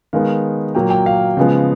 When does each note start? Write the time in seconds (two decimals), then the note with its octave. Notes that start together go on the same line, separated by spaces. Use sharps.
0.13 D#3 G#3 B3 F5
0.74 A#2 F#3 A#3 G5
0.90 G5
1.06 F5
1.37 C#3 F3 G#3 B3